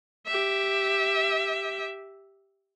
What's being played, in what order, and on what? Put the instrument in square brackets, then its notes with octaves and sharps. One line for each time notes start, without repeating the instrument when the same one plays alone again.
[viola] G4 E5